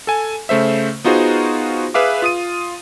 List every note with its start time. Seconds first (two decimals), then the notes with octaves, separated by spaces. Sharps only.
0.07 A4 G#5
0.49 C#3 A3 C5 E5
1.04 B3 D#4 F4 F#4 G#4 C5
1.94 G#4 B4 E5 F5 D6
2.22 F4 D#6 D#7